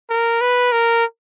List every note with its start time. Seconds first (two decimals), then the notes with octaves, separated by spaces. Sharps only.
0.10 A#4
0.41 B4
0.72 A#4